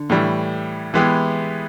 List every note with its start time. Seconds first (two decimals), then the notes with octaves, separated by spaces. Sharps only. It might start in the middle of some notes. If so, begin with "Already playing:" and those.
Already playing: D3
0.10 A2 E3 G3
0.94 E3 G#3 B3 E4 G4